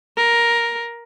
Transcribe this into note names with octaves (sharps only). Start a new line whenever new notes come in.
A#4